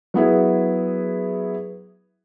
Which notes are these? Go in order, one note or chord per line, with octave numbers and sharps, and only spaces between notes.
F#3 B3 E4 G#4